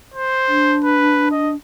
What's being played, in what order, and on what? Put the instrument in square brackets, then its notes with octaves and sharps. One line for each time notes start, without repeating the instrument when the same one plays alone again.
[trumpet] C5
[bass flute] D4
[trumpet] B4
D#5